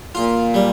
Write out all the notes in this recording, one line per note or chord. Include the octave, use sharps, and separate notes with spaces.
A#2 F4
G3